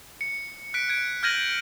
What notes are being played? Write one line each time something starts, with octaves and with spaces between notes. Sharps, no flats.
C#7
F#6 B6 D7
F#6 G#6 D7
F6 G6 G#6 A#6 D#7 F#7